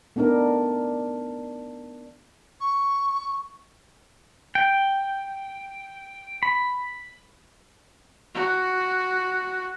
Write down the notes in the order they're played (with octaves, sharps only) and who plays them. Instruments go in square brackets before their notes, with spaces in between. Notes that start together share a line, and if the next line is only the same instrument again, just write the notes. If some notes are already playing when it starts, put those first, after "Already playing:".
[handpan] A3 B3 D4 D#4 A#4
[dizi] C#6
[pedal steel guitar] G5
B5
[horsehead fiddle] F#4